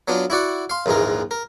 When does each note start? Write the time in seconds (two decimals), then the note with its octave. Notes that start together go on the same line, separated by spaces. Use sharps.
0.08 F#3 B3 D4 F4
0.30 E4 F#4 D5 F#5
0.70 F5 C6
0.86 A#1 D#2 G#2 E3 A#4
1.31 A#4